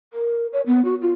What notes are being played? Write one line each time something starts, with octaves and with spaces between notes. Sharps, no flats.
A#4
C#5
B3
F#4
F4